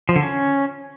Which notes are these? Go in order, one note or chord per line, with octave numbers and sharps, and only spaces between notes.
F3
D3
C#4